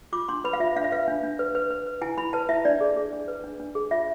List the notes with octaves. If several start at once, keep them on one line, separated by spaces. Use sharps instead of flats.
F4 D6
D4 C6
B4 B5
F5
F4 E5
D4 F5
E5
B4 F5
D4
D4
B4
B4
B4
B4
E4 G#5
E4 B5
B4 A5
E4 E5
D4 D5
G#4
G#4
D4
B4
D4
D4
G#4
F4 E5